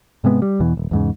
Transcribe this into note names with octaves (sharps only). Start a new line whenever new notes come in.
G#2 C3 G#3 B3
G3
E2 B2 E3
D#1
E2 G#2 C#3